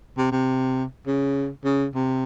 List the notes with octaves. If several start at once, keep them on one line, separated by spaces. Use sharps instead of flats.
C3
C3
C#3
C#3
C3